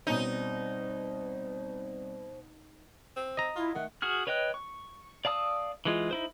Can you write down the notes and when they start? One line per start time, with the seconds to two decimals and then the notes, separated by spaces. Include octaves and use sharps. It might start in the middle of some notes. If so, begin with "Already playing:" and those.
0.07 B2 G3 C4 C#4 D#4 C5 D5
3.16 C4
3.37 D#5 A#5
3.56 E4 F4
3.75 D#3 A3 F#5
4.02 F#4 G#4 F6
4.27 B4 C#5 D#5 G5 F#6
4.54 C#6
5.25 D5 F5 A5 D#6 E6
5.85 E3 G#3 F4
6.11 D#4 E4 C5